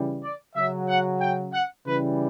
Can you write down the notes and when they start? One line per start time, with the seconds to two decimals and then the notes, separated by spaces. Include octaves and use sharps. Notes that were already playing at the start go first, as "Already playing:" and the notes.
Already playing: C#3 E3 G3
0.23 D5
0.56 C#3 F#3 E5
0.88 F#5
1.21 G5
1.53 F#5
1.86 C#3 E3 G3 B4